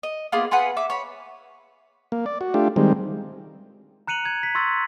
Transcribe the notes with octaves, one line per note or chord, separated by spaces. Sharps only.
D#5
A#3 B3 F4 G#4
F4 G#4 B4 F#5
E5 D6
C#5 B5
A#3
D5
F#4
A3 D4 F4 G4
D#3 G3 G#3 C4
A#5 F#6 C#7 D#7 F7 F#7
G#6
B6
C6 C#6 E6 A6